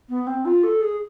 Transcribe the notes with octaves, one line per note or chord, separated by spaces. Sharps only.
B3
C4
F4
A4
G#4